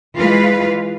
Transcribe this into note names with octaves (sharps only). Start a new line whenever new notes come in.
E3 G#3 F4 B4 F5